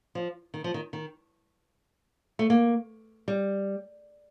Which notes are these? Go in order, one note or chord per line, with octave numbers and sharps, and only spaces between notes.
F3
D#3
F3
D#3
D#3
A3
A#3
G3